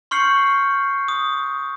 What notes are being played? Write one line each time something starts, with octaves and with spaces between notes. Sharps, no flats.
C6 C#6 F6 G6 C7 C#7
D#6